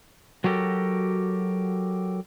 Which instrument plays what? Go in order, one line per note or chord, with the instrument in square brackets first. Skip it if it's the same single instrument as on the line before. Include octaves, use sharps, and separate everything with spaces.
[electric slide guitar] F#3 F#4 G4 A4 A#4